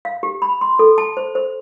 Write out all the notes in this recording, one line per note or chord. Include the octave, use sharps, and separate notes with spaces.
F5
G4
B5
C6
A4
A5
C5
C5